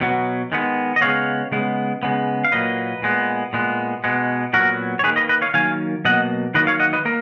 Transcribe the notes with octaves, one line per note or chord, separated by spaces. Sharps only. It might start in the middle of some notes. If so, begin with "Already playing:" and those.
B2 F#3 B3
D#3 G#3 B3
D#5
C#3 G#3 B3 C#5 F5
C#3 G#3 B3
C#3 G#3 B3
F5
A#2 F#3 A#3 B4 D#5
A#2 G#3 B3
A#2 G#3 B3
B2 G#3 B3
A#2 F#3 B3 F#4 A#4
C#5
D#3 A#3 G#4 B4
B4 D#5
B4 D#5
C#5 F5
D#3 F#3 A#3 F5 G#5
B2 F#3 A#3 D#5 F#5
D#3 F#3 A#3 B4 D#5
C#5 F5
D#5 F#5
B4 D#5
A#3 A#4